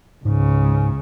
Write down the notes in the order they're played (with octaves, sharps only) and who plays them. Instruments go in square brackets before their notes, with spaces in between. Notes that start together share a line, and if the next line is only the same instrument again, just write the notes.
[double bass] C#2 C#3 [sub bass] G#2